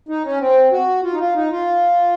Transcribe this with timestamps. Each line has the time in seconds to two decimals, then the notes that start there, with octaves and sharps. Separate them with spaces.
0.09 D#4
0.24 C#4
0.40 C4
0.72 F#4
1.04 F4
1.13 D#4
1.20 F4
1.35 D#4
1.51 F4